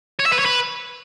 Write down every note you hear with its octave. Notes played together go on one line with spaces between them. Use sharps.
C#5
E5
B4
C#5
B4